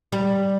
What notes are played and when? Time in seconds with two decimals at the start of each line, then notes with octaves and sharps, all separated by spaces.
0.12 G3